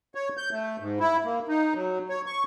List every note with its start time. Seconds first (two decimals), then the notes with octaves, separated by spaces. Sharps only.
0.15 C#5
0.37 G6
0.51 A3
0.80 G#2
1.00 E4
1.24 A#3
1.48 D#4
1.74 F#3
2.09 C#5
2.26 C#6